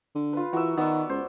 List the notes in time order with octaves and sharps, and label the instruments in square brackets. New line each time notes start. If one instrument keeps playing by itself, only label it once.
[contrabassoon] D3
[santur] F4 B4
[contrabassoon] E3 [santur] F#4 A#4 E5
[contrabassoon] D#3 [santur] B3 D5 E5
[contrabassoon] C#2 [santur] C5